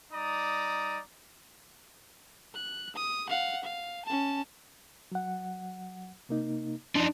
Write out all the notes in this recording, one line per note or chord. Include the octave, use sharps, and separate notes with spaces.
G3 D#4 D5 A#5 D#6
F#6
D#6
F5 F#5
F5
C#4 A5
F#3 F#5
C3 A#3 D#4
F#2 F3 D4 D#4 C6